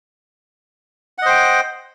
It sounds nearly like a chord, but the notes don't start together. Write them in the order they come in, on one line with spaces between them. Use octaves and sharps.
F#5 D#5 C5 G5